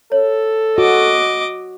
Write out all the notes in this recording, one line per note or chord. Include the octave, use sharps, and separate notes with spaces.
A4 C#5
F#4 D#5 D6